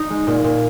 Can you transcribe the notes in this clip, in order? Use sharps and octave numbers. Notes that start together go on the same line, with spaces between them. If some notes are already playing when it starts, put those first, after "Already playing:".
Already playing: D#4
G#3
A#2
A#2